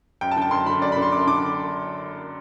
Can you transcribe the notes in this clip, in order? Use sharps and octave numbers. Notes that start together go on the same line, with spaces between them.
F#2 G5
A5
D3 G5
A5
F#2 C6
D3 B5
F#2 D5
B5
D3
C6
F#2 D6
D3 D6